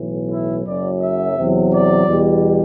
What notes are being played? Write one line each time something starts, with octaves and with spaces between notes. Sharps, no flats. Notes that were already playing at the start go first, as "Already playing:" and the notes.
Already playing: B1 A2 E3
E4
F#1 F#2 F#3 D5
E5
E2 C3 F#3
D5
E2 B2 G3